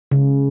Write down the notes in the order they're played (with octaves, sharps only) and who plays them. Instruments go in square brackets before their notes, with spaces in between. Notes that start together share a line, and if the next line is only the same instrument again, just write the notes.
[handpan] C#3